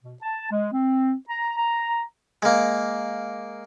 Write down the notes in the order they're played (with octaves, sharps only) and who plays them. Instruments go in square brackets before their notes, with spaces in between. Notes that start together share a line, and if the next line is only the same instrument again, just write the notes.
[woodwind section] B2
A5
G#3
C4
A#5
A#5
[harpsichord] G#3 A#3